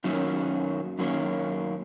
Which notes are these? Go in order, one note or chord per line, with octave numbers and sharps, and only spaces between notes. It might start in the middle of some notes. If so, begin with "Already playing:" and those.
F#2 D#3 F#3 A#3 C#4
F#2 D#3 F#3 A#3 C#4